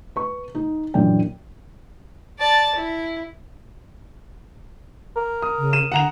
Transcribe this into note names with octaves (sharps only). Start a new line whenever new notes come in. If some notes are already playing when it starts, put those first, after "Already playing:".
B4 C#6
D#4
A#1 F#2 E3 D5 G5
D5 A5
E4
A#4
D#6
C#3
D#7 E7
D3 F#5 A#5 F7